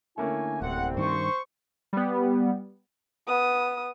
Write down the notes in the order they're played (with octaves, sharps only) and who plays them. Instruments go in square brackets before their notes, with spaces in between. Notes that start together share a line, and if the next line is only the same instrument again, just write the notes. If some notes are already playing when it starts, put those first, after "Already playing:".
[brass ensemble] D3 E4 G#5 [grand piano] A3 A#3 C#4
[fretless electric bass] D1 [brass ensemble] C2 C4 [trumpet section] F#5
[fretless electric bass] G2 D#3 [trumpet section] C5 C#6
[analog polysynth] G3 B3
[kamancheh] B3 D#6